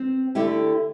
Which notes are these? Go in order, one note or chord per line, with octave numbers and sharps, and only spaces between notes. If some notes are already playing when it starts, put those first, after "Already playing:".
Already playing: C4
D3 A3 E4 G4